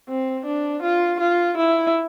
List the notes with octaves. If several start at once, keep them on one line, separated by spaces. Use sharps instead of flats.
C4
D4
F4
F4
E4